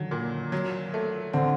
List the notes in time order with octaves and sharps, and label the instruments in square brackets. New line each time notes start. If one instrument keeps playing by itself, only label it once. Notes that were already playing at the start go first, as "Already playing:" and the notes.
Already playing: [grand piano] D3 D#3 [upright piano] F#3
[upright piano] A#2
F#3
A3
[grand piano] D3 [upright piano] C4